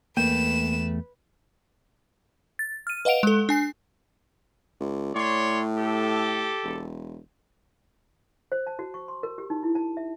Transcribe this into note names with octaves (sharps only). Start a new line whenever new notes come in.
E2 A3 A#3 B4 G5 E7
A6
F6 D#7
B4 D#5 F5 F#5 D7 F7
G#3 A4
D4 G#5 C7
C#2
A2 C#5 D5 C6
G4 A4
E1
C5
A5
F#4
C#6
C6
A#4
G4
D#4
E4
A5
E5